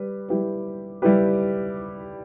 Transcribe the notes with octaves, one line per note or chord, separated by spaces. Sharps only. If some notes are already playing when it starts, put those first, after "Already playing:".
Already playing: G3 B4
G3 E4 G4 B4
G3 E4 G4 B4